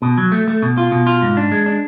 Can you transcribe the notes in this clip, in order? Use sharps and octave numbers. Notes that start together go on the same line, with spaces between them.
B2
F#3
A3
A3
B2
F4
B2
F4
G#2
D4
G#3
D4